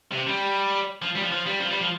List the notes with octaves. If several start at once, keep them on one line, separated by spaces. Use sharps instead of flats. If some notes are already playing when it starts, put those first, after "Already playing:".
C3
G3
F3
G3
F3
F3
G3
F3
G3
F3